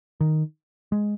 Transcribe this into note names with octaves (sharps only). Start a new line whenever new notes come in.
D#3
G#3